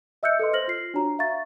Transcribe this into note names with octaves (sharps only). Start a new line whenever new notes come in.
D#5 E5 E6 F#6 G6 C#7
A4 B4 D#5 C6
C5 F6 A#6 F#7
F4 C7
D4 F#4 C#5 A#5
E5 F5 A#5 C#6 A6